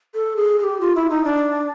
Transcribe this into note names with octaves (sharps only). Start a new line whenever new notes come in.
A4
G#4
G#4
G4
F4
E4
D#4
D4